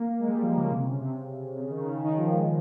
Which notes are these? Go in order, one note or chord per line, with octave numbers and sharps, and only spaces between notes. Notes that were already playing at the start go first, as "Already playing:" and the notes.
Already playing: A#3
G#3
G3
F3
C#3
C3
C#3
C3
C3
C#3
D#3
C#3
C#3
D#3
F3
G#3